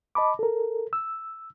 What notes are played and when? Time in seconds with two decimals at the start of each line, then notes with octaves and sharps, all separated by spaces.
0.15 D#5 A5 B5 D6
0.39 A4 A#4
0.93 E6